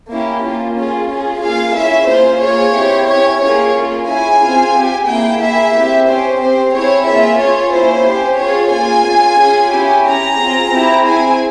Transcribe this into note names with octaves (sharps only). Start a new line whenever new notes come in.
A#3 C#4 E4 G4
A#3 C#4 F4
C#4 F4 G#4
C#4 F4 G#4
A#3 F4 G#4 F5
C#4 E4 G#4 E5
A#3 F4 G#4 C5
A#3 F4 G#4 C#5
C4 E4 G4
C#4 E4 G4 C#5
A#3 C#4 F4 G#4 C#5
A#3 F4 G#4
C#4 E4 G#4 G#5
C4 F4 G#4
C4 G4
A#3 E4 G#4 G5
A#3 E4 G#4 E5
C4 G4
C#4 G4 C5
C4 G4 C5
C4 E4 G#4 C#5
A#3 F4 G#4 E5
C#4 F4 G#4 C#5
A#3 C#4 E4 C5
C#4 G4
C#4 F4 G#4 C#5
A#3 F4 G#4 G#5
C#4 F4 G#4
C#4 F4 G#4
C#4 E4 G4
C#4 G4 A#5
C4 F4 G#4
C4 E4 G4
C4 E4 G#4 G#5